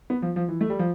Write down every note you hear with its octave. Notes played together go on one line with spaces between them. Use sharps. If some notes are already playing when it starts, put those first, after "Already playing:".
B3
F3
F3
E3
A3
G3
F3